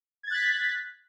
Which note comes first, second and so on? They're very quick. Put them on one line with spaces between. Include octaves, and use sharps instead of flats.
G#6 A6 F#6 B6